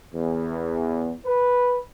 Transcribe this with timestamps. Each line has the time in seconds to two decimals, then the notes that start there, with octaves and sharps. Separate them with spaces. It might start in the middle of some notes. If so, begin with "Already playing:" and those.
0.14 E2
1.26 B4